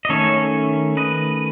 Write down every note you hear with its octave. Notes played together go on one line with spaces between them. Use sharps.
D#5
D#3 A3 C#4 A4 C#5
B4 D#5